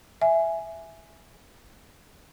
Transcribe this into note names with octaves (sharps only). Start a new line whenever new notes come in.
E5 G#5